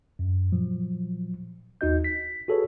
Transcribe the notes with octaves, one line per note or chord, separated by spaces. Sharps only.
F#2
A#2 F3 F#3
D#2 D#4 F#4 D#5 G6
B6
F#4 G#4 A4 B4 C#5